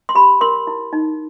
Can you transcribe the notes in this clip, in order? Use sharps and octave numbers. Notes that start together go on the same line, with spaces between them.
C6
G4 B5
A#4 C6
E4
D#4